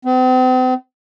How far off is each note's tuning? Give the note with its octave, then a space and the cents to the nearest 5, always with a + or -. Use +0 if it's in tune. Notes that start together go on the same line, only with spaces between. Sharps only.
C4 -40